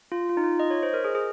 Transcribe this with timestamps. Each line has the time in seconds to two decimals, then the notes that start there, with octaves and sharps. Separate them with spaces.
0.12 F4
0.29 F4
0.37 D#4
0.44 F4
0.60 D#5
0.71 C#5
0.83 C5
0.94 A#4
1.04 G#4
1.15 G#4